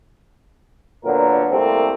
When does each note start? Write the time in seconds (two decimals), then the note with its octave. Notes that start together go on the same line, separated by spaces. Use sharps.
1.04 A#2 D3 F#3 B3 A#4
1.50 C2 C3 A3 A#3 C4